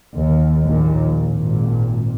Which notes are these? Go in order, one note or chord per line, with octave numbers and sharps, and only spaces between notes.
D#2
A#1 D#2 A#2
G#1 A#2